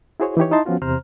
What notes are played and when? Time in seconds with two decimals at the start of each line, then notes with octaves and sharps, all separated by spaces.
0.20 E4 F#4 G#4 C5 C#5
0.37 E3 D#4 G4 C#5
0.51 D#4 E4 D#5 A5 C6
0.66 F3 B3 C#4 F4 F#4
0.82 E2 C3 C5 A#5 F6